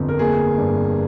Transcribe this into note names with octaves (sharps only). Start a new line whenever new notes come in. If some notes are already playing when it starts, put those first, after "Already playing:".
Already playing: G1 F2
A#4
A#3 G#4
G2